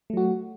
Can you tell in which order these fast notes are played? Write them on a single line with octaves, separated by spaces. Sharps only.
A3 F#3 F#4